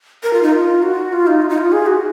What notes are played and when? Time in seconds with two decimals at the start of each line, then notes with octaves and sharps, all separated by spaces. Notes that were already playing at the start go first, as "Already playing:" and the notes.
0.23 A#4
0.33 F4
0.42 D#4
0.53 F4
0.83 F#4
1.13 F4
1.27 D#4
1.42 F4
1.50 D#4
1.58 F4
1.72 G#4
1.86 F#4